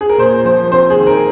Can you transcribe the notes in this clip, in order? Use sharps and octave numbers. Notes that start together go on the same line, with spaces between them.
G#4
A#4
A#2 C5
F3 C5
C3 C5
G#4
D#3
A#4